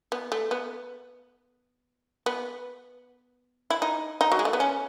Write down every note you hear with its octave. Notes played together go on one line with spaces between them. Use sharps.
B3
A3
B3
B3
E4
D#4
D#4
F#3
G#3
A3
B3
C#4